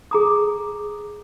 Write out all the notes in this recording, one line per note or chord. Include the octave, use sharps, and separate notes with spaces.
G#4 A#5 D#6